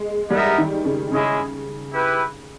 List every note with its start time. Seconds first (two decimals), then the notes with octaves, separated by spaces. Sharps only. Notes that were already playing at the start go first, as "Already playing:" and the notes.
Already playing: G#3
0.30 G3 B3 D#4 A#4 E5
0.58 D#3
0.85 C#3
1.12 C#3 G#3 C#4 E4 G#4 D#5
1.94 E4 G4 B4